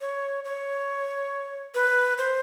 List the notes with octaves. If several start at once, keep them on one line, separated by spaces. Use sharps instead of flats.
C#5
C#5
B4
C5